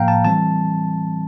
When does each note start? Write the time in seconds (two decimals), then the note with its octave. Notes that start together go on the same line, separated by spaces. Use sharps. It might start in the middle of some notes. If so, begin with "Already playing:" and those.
Already playing: A2 F3 A#3 F5 G5 A#5
0.08 A5
0.25 E3 G3 C4 A5